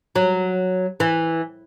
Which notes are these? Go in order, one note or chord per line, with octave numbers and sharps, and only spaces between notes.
F#3
E3